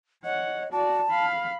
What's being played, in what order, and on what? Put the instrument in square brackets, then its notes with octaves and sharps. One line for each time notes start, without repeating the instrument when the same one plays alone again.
[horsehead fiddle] C#5 F#5 [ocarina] D#5
[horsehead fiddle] F#4 D5 [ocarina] A5
[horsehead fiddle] F5 B5